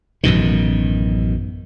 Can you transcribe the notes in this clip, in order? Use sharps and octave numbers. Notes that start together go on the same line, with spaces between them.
A1 F#2 B2 D#3